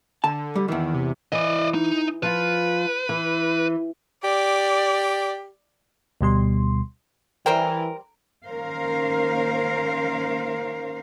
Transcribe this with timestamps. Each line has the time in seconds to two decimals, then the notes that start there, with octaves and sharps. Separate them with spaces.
0.24 D3 A5
0.55 G3
0.68 E2 D#3 E3
0.94 C3
1.32 E3 D5 D#5
1.75 D#4
2.23 F3 F4 B4
3.09 E3
4.24 G4 D5
6.21 D2 B2 G3 C6
7.46 E3 G3 A#4 C5 G5
8.47 D#3 A#3 C#4 A#4 C5 F5